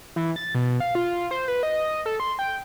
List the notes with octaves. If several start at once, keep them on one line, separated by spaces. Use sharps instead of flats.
E3
A6
B2
F5
F4
C5
B4
D#5
A4
C6
G5